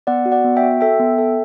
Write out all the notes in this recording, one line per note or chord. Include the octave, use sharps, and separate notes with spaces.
B3 D5 F#5
F#4
D5 F#5
B3
E5 G5
F#4
A4 E5 G5
B3
A4